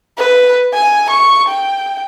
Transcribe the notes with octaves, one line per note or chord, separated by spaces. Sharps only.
B4
G#5
C#6
G5